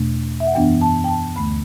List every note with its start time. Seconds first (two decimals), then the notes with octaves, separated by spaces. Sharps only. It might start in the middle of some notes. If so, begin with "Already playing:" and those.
Already playing: E2 B2 A3 D4
0.40 E5
0.47 F#5
0.54 F#2 E3 B3 D4 G5
0.81 A5
1.04 G5
1.08 A5
1.36 D2 D3 A3 B5